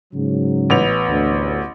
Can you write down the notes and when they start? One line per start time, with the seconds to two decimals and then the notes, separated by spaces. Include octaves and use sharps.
0.14 G#2 C#3 F#3
0.70 A1 B3 F7
1.08 D2